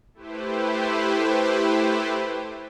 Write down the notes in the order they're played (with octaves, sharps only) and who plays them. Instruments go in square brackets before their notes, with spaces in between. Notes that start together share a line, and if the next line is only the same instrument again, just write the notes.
[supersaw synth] A3 E4 G4 B4 C5